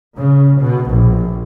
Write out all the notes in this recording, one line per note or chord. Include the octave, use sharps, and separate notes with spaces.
C#3
B2
A#1